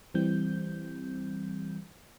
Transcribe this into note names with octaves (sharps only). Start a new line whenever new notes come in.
E3 G3 C4 G6